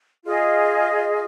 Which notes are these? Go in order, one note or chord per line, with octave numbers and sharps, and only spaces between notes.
F4 G#4 D#5